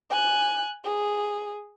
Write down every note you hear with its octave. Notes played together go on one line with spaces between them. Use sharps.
G#5 F#6
G#4